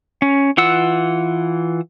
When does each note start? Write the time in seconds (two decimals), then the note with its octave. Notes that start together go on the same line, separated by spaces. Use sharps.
0.22 C#4
0.57 E3 F4 F#5 E6